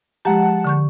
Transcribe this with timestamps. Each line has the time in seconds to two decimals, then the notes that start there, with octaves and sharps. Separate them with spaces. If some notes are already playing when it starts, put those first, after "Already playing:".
0.25 F3 G#3 G4 F#5 A5 A#5
0.64 D3 C#6 G6